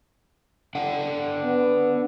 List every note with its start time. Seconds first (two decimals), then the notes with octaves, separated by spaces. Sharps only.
0.75 D4 F#5 G5
1.44 B3